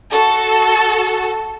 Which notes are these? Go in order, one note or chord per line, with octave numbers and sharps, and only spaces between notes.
F#4 A4